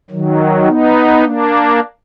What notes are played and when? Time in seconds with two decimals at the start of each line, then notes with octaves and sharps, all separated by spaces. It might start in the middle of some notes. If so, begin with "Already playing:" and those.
0.10 D#3 F#3
0.66 B3 D#4
1.21 A#3 D4